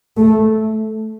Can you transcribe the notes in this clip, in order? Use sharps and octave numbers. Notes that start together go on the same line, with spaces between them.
A3